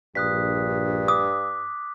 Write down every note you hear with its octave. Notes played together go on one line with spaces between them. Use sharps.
A#1 G2 D#6 F#6 B6
D6 D#6